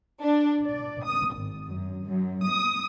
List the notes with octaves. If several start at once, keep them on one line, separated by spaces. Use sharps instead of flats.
D4
D5
D#6
G#1
F#2
F#2
D#6